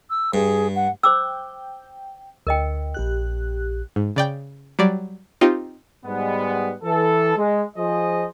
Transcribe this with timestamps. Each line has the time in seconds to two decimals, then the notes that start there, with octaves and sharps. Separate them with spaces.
0.10 E6
0.34 G2 G#4
0.75 F#5
1.03 C5 G5 D6 E6
2.47 D2 A#4 D#5 G5
2.94 A#1 G4 F#6
3.96 G#2
4.16 C#3 D5 G5
4.79 F#3 G3 D5
5.41 C4 D#4 F4 G4
6.05 G#2 G3 G#3 B3
6.83 E3 A4
7.37 G#3
7.76 F3 G#4 C5 D#5